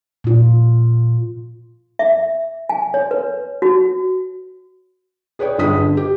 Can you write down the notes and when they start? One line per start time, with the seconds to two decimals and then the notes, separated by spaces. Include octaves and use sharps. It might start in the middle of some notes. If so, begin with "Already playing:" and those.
0.24 A#2 F4
1.99 E5
2.69 G#5
2.94 C#5
3.11 B4
3.62 F#4
5.39 G#4 B4 C#5 D5 G5
5.58 G1 F4 G#4 B4 D#6 B6
5.78 D3
5.97 G4